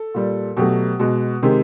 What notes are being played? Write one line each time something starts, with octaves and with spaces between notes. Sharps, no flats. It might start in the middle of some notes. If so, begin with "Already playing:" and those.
Already playing: A4
A#2 G3
B2 F#3 A3 G4
B2 G#3 F#4
C3 D#3 G#3 G4